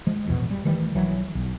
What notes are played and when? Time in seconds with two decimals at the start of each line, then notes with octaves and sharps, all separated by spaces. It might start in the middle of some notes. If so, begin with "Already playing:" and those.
0.07 F3 G#3
0.27 A1 E2 B2
0.51 G3
0.65 D#3 E3 G3 A3
0.95 B1 E3 F#3
1.35 B1